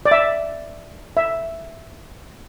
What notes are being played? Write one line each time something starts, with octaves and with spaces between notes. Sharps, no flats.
D5
E5
E5